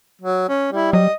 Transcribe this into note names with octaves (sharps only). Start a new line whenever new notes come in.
F#3
C#4
G3 E4
F#3 D#5